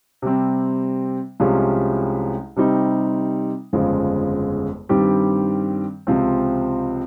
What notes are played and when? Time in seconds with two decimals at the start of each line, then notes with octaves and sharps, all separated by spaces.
0.22 C3 G3 C4
1.40 C2 C3 F3 G#3 C#4
2.56 C3 G3 C4 D#4
3.73 G1 F2 C#3 F3 G#3
4.89 G2 D#3 G3 C4 G4
6.07 C#2 C3 F3 C4